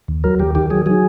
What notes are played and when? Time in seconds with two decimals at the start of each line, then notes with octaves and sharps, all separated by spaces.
0.08 D#2
0.24 F#3 A#4
0.40 D#2 G4
0.55 D#3 G4
0.70 F#3 G#4
0.86 F#3 G#4